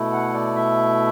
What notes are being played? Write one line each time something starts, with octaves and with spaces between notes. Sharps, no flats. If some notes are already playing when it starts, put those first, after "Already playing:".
Already playing: B2 A3 E4
F#5
D5
E5